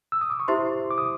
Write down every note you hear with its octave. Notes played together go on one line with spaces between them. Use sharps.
E6
D#6
D6
C#6
E4 G4 C5 E5 C6
D6
D#6